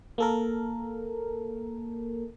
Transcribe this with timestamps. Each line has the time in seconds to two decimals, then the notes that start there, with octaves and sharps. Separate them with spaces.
0.18 A#3 A4 A#4